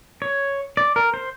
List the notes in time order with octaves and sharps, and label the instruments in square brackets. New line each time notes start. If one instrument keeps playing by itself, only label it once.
[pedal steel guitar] C#5
D5
A#4
C5